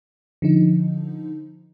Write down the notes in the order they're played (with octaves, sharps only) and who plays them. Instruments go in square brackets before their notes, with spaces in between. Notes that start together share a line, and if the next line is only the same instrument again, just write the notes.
[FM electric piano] D3 F3 D#4